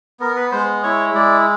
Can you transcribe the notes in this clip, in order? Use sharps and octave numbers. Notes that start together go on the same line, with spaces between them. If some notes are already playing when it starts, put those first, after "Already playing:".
B3 A#4
B4
G#3 C5
E4 C#5
G#3 D5